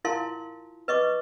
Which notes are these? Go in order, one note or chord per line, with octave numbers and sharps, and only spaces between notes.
E4 F4 A#4 F5 A5 C6
B4 D#5 C#6 D6